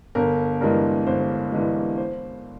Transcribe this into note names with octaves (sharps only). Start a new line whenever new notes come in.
G1 A#4
G2 E3 G#3 A#4
G1 C5
G2 E3 G#3
C5